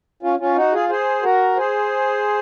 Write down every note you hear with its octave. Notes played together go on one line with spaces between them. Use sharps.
C#4 F4
C#4 F4
D#4 F#4
F4 G#4
G#4 C5
F#4 A#4
G#4 C5